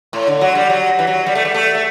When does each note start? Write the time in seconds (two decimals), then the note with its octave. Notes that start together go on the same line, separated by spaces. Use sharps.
0.13 A2
0.27 D3
0.41 F#3
0.55 G3
0.70 F#3
0.99 E3
1.07 F#3
1.26 G3
1.35 A3
1.45 G3
1.54 A3
1.75 A3